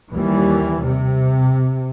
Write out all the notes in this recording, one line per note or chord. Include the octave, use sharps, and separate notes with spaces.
D#2 E3 G3
C3